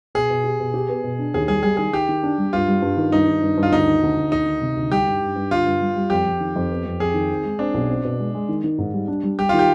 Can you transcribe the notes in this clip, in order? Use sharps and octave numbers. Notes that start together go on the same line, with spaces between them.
B2 G#4
B2
G4
B2
G4
B3
B2
D4
D#2 G#4
G3 G#4
G3 G#4
D#3 G#4
D#3 G4
D#3
D4
G3
G2 F4
G3
G2
D#3
G2 D#4
D#3
G2
G2
F4
D2 D#4
D#3
D2
D2
D2 D#4
D#3
C3
D2
G3 G4
G2
G2
G2
D3 F4
G2
G3
G3
F2 G4
F2
D#3
F2
B3
F2
F2 G#4
D#3
C4
G#3
C4 D4
B1
C4
B2
G#3
G#3
D#3
D#3
G#2
G3
D4
G3
G3 G4
D#3 F4
G4